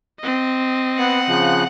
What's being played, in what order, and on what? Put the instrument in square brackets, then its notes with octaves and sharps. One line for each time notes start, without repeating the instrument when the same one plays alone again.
[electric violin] C4 D#5
[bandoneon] B3 [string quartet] F#5
[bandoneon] C#3 F3 F#6